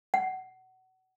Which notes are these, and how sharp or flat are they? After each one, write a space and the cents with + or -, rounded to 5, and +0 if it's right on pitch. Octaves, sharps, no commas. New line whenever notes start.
F#5 +25